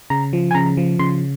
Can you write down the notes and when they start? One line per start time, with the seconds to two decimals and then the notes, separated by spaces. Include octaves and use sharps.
0.10 C#3 A#5
0.33 F3
0.51 G#5
0.55 C#3 A#5
0.77 F3
0.99 C#3 C6